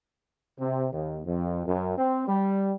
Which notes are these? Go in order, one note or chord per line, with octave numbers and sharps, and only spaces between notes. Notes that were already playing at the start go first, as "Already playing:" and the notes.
C3
D#2
F2
F#2
C4
G3